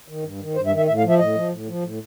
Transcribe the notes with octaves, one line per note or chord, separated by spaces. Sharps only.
D#3
G2
D#3
G2 C5
E5
D#3
E5
A2 E5
F5
F3
E5
A2 D#5
F3
A2
F3
A2